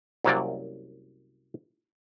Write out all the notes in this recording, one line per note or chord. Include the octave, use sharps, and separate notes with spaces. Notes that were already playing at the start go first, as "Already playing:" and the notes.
C2 F#2 C3 F#3 A#3 D5